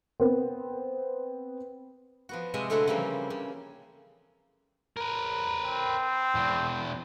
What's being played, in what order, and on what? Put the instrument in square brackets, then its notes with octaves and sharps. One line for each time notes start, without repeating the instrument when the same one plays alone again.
[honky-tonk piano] B3 C4
[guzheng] F3 B3 F#4
C3 G#3 F4 D#5 E5
D3 A3 C4 E4 F#4
C#3 E3 F3 G3 A#3 C4
C#3
[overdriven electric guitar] A#4 B4
[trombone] C4
[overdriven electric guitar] E2 B2